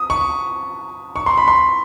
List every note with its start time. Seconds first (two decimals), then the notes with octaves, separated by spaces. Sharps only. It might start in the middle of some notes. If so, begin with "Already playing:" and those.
Already playing: D#6
0.10 C#6
1.16 C#6
1.26 C6
1.38 B5
1.48 C6